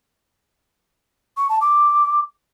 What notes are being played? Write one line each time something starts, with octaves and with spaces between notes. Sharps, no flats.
C#6
A5
D6